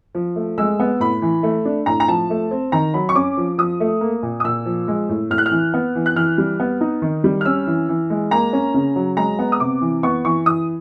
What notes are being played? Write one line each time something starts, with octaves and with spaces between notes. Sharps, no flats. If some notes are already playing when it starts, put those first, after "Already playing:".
F3
A3
G#3 E6
B3
A2 B5
E3
A3
D4
A2 A#5
A#5
F3 A5
A3
C4
D#3 A#5
F#3 B5
C#6
C#4 D6
F3
F3 D#6
A3
A#3
A#2
D#6
A#2 E6
F3
G#3
A2
A2 F6
F#6
F6
E3
B3
E3
F#6
E3 F6
G3
B3
D#4
D#3
G3
F6
C#4 E6
E3
E3
G#3
A#3 A#5
C#4
C#3
F#3
G#3 A#5
B3
D#6
C3 D6
E3
B3 C#6
E3 C#6
E3 D#6